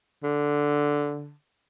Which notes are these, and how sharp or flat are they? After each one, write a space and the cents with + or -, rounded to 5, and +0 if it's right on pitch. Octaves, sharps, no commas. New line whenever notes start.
D3 -5